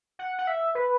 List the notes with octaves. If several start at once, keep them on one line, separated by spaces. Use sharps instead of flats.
F#5
F#5
E5
B4